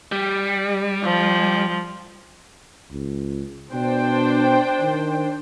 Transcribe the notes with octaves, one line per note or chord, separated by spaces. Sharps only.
G3
F3
C#2
B2 D4 C5 G5
D#3